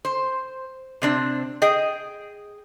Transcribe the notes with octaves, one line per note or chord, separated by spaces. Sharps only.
C5
C3 C4 D4
G#4 D#5 G5